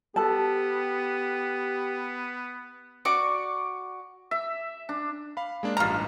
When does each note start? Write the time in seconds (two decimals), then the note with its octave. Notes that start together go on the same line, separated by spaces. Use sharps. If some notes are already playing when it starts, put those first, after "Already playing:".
0.16 B3 G4 A4 A5
3.05 F#4 D5 C#6 D6
4.31 E5
4.89 D4
5.37 F5 B5
5.63 G#3 A#3 D4
5.77 A1 G2 F4 A#5 F6